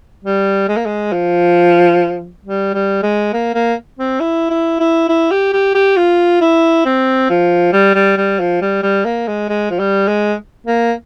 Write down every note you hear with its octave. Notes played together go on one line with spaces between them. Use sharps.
G3
G#3
A#3
G#3
F3
G3
G3
G#3
A#3
A#3
C4
E4
E4
E4
E4
G4
G4
G4
F4
E4
C4
F3
G3
G3
G3
F3
G3
G3
A#3
G#3
G#3
F3
G3
G#3
A#3